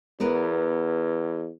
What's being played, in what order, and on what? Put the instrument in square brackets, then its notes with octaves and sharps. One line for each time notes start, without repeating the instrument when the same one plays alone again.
[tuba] E2 [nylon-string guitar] B3 A#4 B4